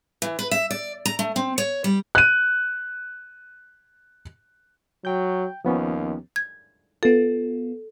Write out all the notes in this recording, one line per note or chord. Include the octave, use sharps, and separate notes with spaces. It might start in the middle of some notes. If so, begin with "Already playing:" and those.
E3
B4
E5
D5
A#5
A3
C4
C#5
G3
F#6 D#7
F#3 G5 G6
D#2 F3 B3 C#4
G#6
B3 F4 A4